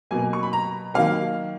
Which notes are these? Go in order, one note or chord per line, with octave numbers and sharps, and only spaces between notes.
B2 F#3 A#3 G#5
C#6
B5
A#5
D#3 F#3 A#3 F5